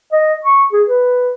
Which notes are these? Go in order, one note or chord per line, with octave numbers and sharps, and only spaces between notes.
D#5
C#6
G#4
B4